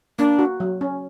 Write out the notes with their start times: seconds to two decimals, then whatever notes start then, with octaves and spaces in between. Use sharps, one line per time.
0.19 A#3 D4
0.39 F#4
0.60 F#3
0.81 C#4